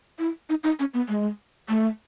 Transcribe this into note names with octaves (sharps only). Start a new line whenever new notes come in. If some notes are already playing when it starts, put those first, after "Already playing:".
E4
D#4
D#4
C#4
B3
G#3
A3